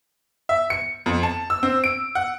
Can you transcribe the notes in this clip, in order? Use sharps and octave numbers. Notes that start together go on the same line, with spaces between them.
E5
C#7
F2
A5
E6
C4
D7
F#5